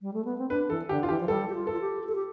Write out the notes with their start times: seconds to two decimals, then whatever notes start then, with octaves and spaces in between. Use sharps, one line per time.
0.01 G3
0.14 A3
0.25 B3
0.38 C4
0.50 D4 B4
0.69 E3 A4
0.89 D3 G4
1.03 F4
1.09 E3 G4
1.20 F3
1.28 G3 A4
1.49 G4
1.55 F4
1.67 A4
1.72 F4
1.81 G4
2.07 A4
2.15 G4